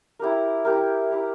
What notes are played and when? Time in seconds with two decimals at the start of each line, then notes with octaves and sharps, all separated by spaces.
0.19 E4 G4 A#4
0.65 E4 G4 A#4
1.10 E4 G4 A#4